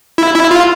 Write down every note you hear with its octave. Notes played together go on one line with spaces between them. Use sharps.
E4
E4
F4